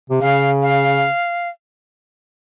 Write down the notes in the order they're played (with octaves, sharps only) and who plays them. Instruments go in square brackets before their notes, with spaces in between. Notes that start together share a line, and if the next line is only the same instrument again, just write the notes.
[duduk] C3
[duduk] C#3 [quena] F5
[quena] F5